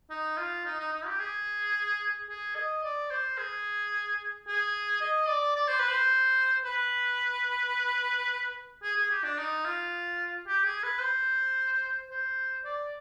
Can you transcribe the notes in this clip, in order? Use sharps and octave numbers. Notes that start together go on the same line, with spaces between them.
D#4
F4
D#4
D#4
D#4
G4
G#4
G#4
D#5
D5
C5
G#4
G#4
D#5
D5
D5
C5
B4
C5
B4
G#4
G#4
G4
D4
D#4
F4
G4
G#4
B4
C5
C5
D5